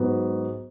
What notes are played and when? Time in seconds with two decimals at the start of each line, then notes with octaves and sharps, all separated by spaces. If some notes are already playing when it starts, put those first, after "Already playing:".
Already playing: G#2 F#3 B3 F#4 B4